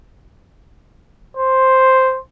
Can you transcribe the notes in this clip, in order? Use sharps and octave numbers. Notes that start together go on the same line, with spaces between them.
C5